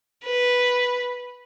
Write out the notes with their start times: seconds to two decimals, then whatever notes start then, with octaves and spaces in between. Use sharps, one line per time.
0.25 B4